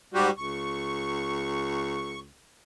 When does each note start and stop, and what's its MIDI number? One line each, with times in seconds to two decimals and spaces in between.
0.14 0.30 44
0.14 0.30 55
0.14 0.30 66
0.14 0.30 67
0.37 2.32 37
0.37 2.20 85